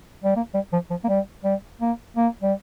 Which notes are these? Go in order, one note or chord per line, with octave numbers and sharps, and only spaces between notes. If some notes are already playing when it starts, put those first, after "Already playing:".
G3
A#3
G3
F3
F3
A#3
G3
G3
A#3
A#3
G3